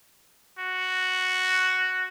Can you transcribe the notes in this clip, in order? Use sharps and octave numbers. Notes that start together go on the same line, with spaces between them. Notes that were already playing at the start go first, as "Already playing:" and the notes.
F#4